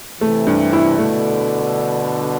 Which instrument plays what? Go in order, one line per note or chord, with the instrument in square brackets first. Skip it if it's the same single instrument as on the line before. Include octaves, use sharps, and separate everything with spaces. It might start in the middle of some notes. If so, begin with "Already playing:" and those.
[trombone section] C3 E3 [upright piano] A3
[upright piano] G2
E4
[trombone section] B2 D3 [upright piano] A3